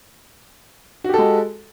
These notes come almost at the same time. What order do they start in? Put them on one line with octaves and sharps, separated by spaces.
F#4 G4 A4 G#3